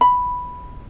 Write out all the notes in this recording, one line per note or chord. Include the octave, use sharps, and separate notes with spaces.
B5